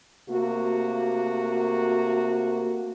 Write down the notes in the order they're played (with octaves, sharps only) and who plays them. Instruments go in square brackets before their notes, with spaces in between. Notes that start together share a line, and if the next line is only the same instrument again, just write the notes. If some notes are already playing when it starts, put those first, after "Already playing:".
[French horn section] C3 A3 A#3 F#4